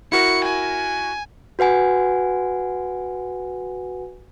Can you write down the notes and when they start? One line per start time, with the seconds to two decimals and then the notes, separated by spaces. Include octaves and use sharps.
0.12 E4 F#4 A#4 C#7
0.45 G#5
1.59 F#4 B4 F#5 G#5